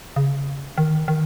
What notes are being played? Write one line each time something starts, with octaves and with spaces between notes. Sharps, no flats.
C#3
D#3
D#3